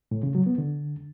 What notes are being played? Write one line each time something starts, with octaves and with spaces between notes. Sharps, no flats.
A2
C#3
F#3
B3
D3